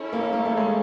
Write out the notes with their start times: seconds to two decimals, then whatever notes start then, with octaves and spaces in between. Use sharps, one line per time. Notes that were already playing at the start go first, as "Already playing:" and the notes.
Already playing: C#4 E4 A4 C#5
0.12 A#3
0.33 A#3
0.45 A3
0.57 G#3